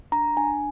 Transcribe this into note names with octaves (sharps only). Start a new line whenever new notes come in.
D4 A#5
D4 G#5